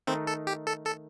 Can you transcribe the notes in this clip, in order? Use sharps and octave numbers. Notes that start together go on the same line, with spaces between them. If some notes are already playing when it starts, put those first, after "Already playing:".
D#3 A3 C4 D#4
A4
G4
A4
A4